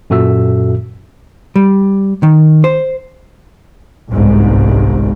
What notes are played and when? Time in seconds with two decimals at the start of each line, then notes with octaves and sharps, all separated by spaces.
0.10 F#2 A#2 F#4 A4 E5 E6
1.56 G3
2.23 D#3
2.64 C5
4.12 G1 C2 G#2